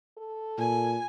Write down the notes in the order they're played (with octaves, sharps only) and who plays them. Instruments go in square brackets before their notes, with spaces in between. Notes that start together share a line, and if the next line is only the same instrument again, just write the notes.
[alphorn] A4
[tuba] A#2 [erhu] G#5